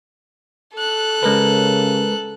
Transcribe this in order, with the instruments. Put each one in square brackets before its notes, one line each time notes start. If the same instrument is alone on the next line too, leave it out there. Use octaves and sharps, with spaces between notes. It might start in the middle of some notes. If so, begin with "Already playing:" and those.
[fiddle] A4 F#6
[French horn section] C#3 [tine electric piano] G#3 A#4 B4